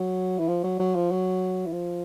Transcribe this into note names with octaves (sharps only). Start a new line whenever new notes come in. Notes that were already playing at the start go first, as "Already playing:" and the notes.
Already playing: F#3
E3
F3
F#3
F#3
F3
F#3
E3
F3